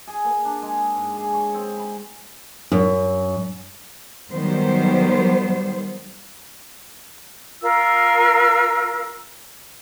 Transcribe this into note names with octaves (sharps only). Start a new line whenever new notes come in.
G#4
A#3
D4
G#3
G#2
G#4
C#5
C4
B5
F#2
D#3 F#3 G3 B3 C5
F4 A#4 E6